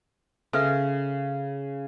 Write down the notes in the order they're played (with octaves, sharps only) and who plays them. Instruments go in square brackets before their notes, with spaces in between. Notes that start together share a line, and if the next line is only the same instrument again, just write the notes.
[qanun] C#3 [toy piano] A4 B4 E5